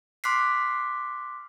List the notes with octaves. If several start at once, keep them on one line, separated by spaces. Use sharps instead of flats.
C6 D6 F6 F#6 B6 C7